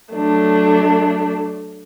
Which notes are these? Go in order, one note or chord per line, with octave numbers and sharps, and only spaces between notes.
F#3 A3 D4